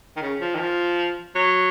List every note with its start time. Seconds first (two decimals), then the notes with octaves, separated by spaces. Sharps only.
0.17 D#3
0.22 C#3
0.41 F3
0.55 D#3
0.59 F3
1.36 F#3